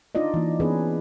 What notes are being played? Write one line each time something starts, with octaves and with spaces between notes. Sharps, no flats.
D4 D#4 F4 D5 D#5
E3 A#3
E3 B3 C#4 D#4 G#4 B4